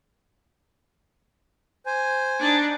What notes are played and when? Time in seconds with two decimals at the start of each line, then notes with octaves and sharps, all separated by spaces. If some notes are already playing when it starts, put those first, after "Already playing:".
1.86 C5 G#5
2.40 D4 D#4